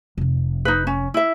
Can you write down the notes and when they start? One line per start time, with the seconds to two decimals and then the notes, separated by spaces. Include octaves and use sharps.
0.18 F1 C3
0.65 D#4 B4
0.87 C#4
1.14 E4 E5